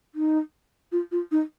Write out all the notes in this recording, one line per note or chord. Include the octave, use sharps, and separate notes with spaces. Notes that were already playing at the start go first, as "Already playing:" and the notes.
D#4
F4
F4
D#4